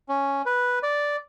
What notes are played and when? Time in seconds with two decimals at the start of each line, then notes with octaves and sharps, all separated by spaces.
0.09 C#4
0.46 B4
0.83 D5